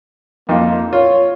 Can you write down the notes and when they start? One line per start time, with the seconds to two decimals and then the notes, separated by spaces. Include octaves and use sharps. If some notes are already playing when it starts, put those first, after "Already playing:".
0.49 F2 A#3 D#4 F4
0.93 F4 C#5